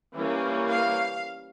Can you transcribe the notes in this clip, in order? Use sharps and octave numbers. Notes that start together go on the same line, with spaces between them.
E3 G3 A#3 C#4
F5